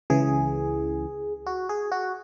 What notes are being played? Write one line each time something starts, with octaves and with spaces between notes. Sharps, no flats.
C#2 C#3 E3 G#4
F#4
G#4
F#4